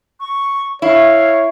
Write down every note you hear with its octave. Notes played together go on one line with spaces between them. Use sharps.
C#6
E4 C#5 F5